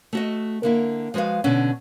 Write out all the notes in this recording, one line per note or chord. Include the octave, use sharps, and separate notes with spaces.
A3 F#4 D#5
D3 A#3 E4
F3 G#3 F#4 B4 F5
B2 D3 C#4